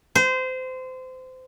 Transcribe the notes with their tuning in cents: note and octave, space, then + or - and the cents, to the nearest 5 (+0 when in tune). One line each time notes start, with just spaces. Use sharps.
C5 -25